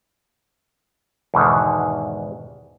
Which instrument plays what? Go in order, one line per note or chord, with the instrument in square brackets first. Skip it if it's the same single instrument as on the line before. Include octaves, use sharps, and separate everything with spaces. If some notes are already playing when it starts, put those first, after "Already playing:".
[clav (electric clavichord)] E2 G#2 B2 D3 D#3